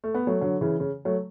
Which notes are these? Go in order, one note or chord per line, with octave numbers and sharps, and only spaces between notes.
A3
B3
F#3 A3
D3 F#3
C#3 E3
C#3
F#3 A3